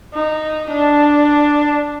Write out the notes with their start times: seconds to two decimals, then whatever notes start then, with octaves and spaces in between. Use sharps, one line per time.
0.14 D#4
0.71 D4